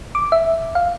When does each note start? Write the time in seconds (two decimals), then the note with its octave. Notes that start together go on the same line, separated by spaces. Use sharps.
0.15 D6
0.32 E5
0.75 F5